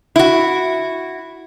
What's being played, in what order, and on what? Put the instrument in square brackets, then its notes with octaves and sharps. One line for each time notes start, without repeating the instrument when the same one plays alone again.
[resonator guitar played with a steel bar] E4 F#4